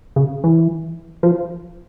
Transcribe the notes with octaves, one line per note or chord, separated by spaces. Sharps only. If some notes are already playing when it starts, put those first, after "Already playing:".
C#3
E3
F3